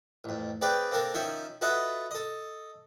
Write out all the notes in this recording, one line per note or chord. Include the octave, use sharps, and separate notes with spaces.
A1 F2
C4 G#4 B4 D5 F5 G5
A#3 C4 D4 A4 A#4
D#3 F3 C#4 C5 C#5 E5
F4 F#4 A4 B4 D#5 E5
A4 D#5